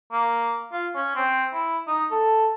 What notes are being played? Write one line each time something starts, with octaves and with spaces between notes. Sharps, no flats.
A#3
F4
C#4
C4
E4
D#4
A4